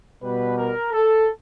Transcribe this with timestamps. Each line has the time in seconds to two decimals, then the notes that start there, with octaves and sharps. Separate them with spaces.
0.23 B2 G3 B4
0.58 A#4
0.92 A4